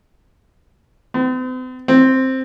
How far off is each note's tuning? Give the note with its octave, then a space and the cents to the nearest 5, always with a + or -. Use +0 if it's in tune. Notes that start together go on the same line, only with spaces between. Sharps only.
C4 -45
C4 +5